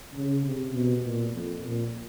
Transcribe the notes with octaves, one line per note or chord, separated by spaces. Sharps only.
C#3
C3
B2
A#2
F2
A#2